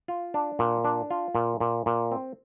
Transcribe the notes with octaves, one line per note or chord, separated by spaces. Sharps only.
F4
D4
A#2
D4
F4
A#2
A#2
A#2
C4